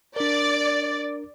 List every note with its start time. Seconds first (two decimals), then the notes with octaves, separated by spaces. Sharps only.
0.16 D4 A#4 D5